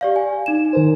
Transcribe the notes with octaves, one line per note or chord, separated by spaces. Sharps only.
G4 D5 F5
G#5
D#4 E7
D#3 A#4 C5